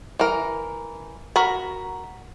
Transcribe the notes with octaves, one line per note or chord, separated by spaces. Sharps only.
E3 A#4
F#4 A#4 A#5 B5